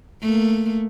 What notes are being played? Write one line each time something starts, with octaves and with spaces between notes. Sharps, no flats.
A3 A#3